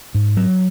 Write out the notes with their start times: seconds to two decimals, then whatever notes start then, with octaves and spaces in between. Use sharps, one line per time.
0.15 G#2
0.37 F#3